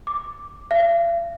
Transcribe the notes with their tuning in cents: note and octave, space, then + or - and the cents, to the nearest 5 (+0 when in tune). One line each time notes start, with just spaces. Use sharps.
D6 +0
F5 -45